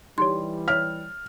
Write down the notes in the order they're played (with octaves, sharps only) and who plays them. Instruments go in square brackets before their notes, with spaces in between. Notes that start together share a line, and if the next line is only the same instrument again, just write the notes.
[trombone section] E3 G3 [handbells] D#4 G4 C#5 [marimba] C6
[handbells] C#5 E5 B6 [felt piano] F6